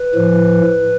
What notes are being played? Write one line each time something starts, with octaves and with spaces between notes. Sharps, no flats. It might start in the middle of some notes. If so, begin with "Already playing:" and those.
Already playing: B4
A2 F3